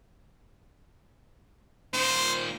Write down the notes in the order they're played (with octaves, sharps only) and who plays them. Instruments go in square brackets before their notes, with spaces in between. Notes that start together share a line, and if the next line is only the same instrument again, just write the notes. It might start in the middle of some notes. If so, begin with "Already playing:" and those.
[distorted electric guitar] A#2 D#3 [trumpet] C5